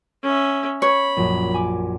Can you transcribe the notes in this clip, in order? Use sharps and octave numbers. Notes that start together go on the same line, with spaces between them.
C#4 E5
C#5 B5
A#1 F#2
G#5 D6